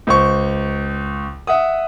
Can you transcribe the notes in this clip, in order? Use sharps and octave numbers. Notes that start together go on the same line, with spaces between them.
C#2 C5 C#6
E5 F#5 D#6